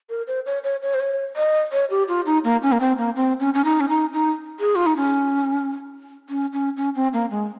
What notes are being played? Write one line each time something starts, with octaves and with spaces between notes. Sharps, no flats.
A#4
C5
C#5
C#5
C#5
C5
C#5
D#5
C#5
G4
F4
D#4
A#3
C#4
A#3
C4
A#3
C4
C#4
C#4
D#4
C#4
D#4
D#4
G#4
F4
D#4
C#4
C#4
C#4
C#4
C4
A#3
G#3